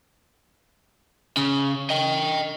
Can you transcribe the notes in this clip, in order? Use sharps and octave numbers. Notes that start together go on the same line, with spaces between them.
C#3
D#5 G5